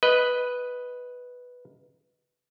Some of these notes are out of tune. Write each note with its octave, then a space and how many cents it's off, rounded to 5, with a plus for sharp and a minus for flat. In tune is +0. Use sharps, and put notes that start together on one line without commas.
B4 +0 D#5 +0